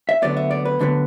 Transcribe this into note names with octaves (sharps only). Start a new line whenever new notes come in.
E5
D2 D3 F#3 B3 D5
E5
D5
B4
D2 D3 F#3 B3